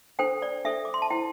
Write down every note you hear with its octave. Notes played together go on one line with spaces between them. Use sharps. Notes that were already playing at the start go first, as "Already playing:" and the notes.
D4 A4 C5 G5
D5
D4 A4 C5 E5
D6
C6
A5
E4 C5 G5